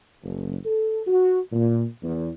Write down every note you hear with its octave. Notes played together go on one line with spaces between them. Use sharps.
F#1
A4
F#4
A#2
E2